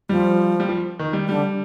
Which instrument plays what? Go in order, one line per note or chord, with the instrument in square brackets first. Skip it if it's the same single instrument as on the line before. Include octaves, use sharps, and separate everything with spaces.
[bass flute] F3 [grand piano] G3
[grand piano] G3
F3
D#3
G3
[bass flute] D3 [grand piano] G3